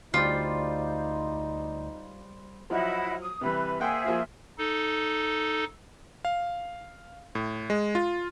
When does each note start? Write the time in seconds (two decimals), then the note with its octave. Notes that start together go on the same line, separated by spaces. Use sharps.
0.14 D2 G3 D#4 F4 C5 D5
2.70 F3 F#3 E4 D#5 F#5
3.21 D#6
3.41 C3 E3 G3 B4
3.80 A#3 G#4 C5 E5 F#5 G5
4.04 F3 A#3 F4
4.58 D#4 A4
6.25 F5
7.35 A2
7.70 G#3
7.95 F4